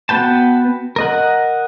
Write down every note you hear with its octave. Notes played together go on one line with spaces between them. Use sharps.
B3 F#4 B4 G5 A5
A#4 D#5 F#5